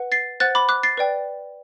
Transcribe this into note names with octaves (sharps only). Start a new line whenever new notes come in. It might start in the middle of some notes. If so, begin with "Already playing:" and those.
Already playing: B4 F#5
A6 C7
C5 F#5 F#6 A6
B5 D6
D6 F#6
A6 C7
B4 D5 G5